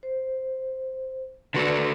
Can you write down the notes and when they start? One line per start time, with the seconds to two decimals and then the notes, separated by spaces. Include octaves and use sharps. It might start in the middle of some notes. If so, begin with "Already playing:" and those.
0.03 C5
1.54 D3 F#4 A4 B4 D5